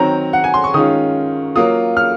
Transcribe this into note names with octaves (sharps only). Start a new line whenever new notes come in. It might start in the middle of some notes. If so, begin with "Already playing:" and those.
Already playing: D#3 F#3 C4 A#5
F#5
G#5
C6
C#6
D#3 G#3 C#4 F4 D#6
F#3 A#3 F4 D#6
F6